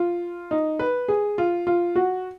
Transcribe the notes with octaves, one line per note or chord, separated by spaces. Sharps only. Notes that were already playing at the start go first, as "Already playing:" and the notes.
Already playing: F4
D#4
B4
G#4
F4
F4
F#4